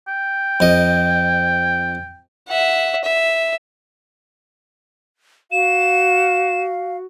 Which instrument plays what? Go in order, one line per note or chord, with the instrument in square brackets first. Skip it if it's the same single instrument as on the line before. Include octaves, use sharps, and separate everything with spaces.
[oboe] G5
[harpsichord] F2 D#5
[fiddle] E5 F#5
E5
[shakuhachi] F#4 [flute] F5 [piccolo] E7